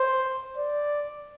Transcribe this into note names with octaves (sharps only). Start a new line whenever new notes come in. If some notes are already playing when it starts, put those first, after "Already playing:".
Already playing: C5
D5